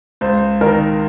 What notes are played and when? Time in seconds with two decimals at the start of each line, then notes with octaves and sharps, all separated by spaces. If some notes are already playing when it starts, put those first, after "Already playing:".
0.21 C#2 C5
0.61 D#3 A#4